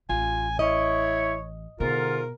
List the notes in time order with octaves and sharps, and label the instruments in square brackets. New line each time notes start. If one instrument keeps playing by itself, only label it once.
[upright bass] A1 [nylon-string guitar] F4 [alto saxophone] G#5
[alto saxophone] E4 [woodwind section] C#5 [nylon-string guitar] D#5
[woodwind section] G#2 D3 F4 [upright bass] B2 [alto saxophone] A#4